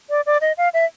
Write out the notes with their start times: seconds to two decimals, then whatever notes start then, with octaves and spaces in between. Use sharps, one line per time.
0.10 D5
0.26 D5
0.41 D#5
0.58 F5
0.74 E5